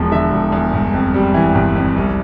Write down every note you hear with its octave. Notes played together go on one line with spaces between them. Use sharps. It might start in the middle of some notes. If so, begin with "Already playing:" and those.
Already playing: E1 E2 F3
D3 E5
E1
E2
G1
F2
G3
E3
G1
F2
C2